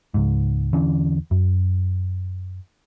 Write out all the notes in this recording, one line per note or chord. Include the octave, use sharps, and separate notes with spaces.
C#2 G#2
E2 D3 E3 C#4
F#2